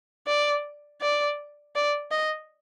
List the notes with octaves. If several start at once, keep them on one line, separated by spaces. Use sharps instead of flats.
D5
D5
D5
D#5